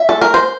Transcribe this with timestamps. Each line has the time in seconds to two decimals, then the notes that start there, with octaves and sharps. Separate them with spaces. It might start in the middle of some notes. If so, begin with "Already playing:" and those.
Already playing: E5
0.09 A4
0.21 A#4
0.34 C5